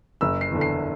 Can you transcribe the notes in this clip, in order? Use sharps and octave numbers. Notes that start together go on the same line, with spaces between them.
F#1 E6
C7
E2 D3
C7